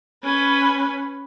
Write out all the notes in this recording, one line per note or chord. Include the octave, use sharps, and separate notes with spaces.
C#4 B4